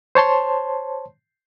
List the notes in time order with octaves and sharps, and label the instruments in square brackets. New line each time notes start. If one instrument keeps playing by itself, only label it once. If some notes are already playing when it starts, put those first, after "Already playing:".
[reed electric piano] C5 C#5 A5 C6